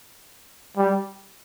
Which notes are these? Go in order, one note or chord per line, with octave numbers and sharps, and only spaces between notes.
G3